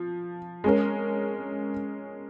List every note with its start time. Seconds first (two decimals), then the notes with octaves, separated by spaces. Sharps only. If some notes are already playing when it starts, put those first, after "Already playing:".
Already playing: F3
0.64 G#3 C#4 A#4